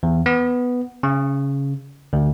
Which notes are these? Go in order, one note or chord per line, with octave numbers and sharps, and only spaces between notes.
E2
B3
C#3
D2